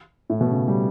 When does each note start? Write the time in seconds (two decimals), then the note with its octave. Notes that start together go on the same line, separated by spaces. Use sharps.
0.30 A2
0.41 B2
0.51 C#3
0.68 G3